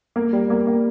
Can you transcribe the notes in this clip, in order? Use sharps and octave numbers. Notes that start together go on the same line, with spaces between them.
A#3
G3
A#3
A#3